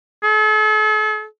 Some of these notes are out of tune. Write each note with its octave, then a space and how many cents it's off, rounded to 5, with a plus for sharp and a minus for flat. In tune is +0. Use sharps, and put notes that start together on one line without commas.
A4 -45